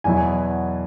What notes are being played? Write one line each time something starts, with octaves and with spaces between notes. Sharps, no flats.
E2 B2 F#3 E4 G#5